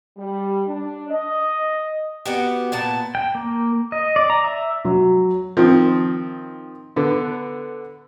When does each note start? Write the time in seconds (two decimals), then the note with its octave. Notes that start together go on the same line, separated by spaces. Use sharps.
0.17 G3
0.67 D4
1.10 D#5
2.26 B3 F#4 G4
2.72 A#2 B3 A5
3.15 G5
3.35 A#3
3.92 D#5
4.16 D5
4.30 A#5
4.44 E5
4.85 F#3
5.57 D#3 F3 C4
6.96 D3 B3